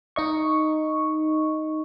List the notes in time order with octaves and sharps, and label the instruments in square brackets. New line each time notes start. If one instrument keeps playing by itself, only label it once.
[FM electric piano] D#4 D#5 C#6